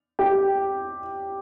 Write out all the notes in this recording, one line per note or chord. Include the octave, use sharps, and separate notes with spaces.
G4 G5